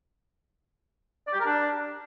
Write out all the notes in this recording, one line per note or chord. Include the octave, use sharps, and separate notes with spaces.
D5
G4
A#4
D4